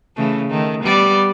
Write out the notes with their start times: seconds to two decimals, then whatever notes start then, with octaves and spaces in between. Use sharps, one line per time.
0.16 C#3 E3 A3
0.49 D#3 A3
0.83 G3 B3 D5